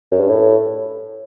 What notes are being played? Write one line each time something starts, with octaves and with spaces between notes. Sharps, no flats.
F#2
G2
A2